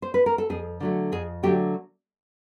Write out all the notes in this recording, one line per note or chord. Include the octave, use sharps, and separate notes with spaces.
C5
B4
A#4
A4
F2 G#4
D3 F#3 A3
F2 G#4
D3 F#3 A3 G4